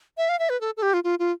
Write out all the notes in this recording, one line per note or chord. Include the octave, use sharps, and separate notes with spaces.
E5
F5
E5
B4
A4
A4
G4
F4
F4
F4